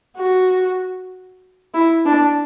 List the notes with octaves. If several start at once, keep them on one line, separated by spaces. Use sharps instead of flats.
F#4
E4
D4